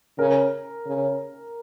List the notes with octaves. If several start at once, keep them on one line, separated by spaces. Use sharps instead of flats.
C#3 A#4
C#3